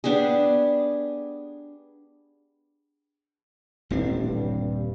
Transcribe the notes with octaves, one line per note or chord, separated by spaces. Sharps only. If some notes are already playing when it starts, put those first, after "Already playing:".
B3 D4 G4 G#4
D#1 A1 C4 D4
G2